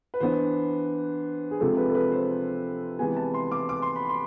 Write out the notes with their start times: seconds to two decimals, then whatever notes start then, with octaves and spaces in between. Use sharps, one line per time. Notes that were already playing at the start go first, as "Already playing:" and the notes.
0.14 B4
0.20 E3 B3 D4 C5
1.51 G#4
1.60 C3 F3 G#3 A4
1.77 B4
1.89 A4
1.95 B4
2.12 C5
2.99 C3 E3 G#3 B3 G#5
3.17 A5
3.34 C6
3.51 D6
3.69 D6
3.82 C6
3.96 B5
4.09 C6